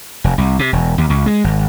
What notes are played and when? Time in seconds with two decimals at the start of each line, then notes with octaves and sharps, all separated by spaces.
0.24 F1
0.38 C2
0.59 C3
0.73 E1
0.98 D#2
1.10 C#2
1.26 G#3
1.44 G#1